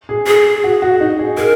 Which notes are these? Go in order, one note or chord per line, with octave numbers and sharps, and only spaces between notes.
G#4
G#4
F#4
F#4
D#4
G#4
G#4 A#4